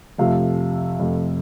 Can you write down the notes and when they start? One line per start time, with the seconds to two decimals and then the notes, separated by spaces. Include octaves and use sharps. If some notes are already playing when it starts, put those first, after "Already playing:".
0.18 F2 C3 F3 A3 F5
1.00 F2 C3 F3 A3